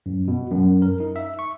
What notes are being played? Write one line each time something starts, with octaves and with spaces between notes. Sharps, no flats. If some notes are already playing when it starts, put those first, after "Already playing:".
F#2
B2
F#2
A#4
D#4
E5
C#6